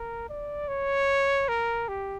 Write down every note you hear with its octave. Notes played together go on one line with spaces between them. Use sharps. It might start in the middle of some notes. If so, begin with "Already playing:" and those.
Already playing: A#4
D5
C#5
A#4
G4